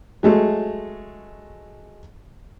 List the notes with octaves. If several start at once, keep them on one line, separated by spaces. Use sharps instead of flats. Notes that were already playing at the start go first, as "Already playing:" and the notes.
F#3 G#3 A3